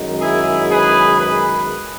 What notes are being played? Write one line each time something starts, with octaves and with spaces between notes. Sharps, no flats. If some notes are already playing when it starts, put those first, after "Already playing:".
Already playing: F#2 D#3 G#3
E4 G#4
G#4 B4
G#4 B4